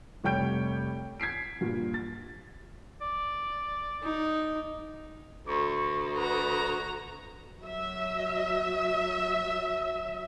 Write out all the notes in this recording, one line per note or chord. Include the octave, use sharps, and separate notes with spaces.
F1 G3 C#5 G5 G6 D7
G#6 B6 C7 D7
G2 A#2
A6
D5
D#4
D2 C#6
F#4 B4 A#5
F#3 E5